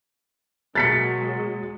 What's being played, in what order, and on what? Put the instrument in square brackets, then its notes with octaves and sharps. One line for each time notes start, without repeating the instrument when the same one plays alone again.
[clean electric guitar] B2 A#3 [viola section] F#3 G#3 [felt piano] A6 B6 C#7